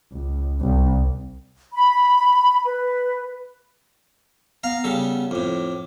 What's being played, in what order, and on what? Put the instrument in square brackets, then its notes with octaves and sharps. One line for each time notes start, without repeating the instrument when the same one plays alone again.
[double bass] C#2
C2
[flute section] B5
B4
[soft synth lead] B3 [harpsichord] F5 A#5
[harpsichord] C#3 G3 A4
[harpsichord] F2 A2 [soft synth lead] D6